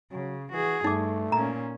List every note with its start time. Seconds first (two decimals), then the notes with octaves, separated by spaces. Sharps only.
0.12 C#3 F#3
0.52 E3 F#4 G#4
0.84 G2 A3 D#4 D6
1.32 A#2 C#4 A#5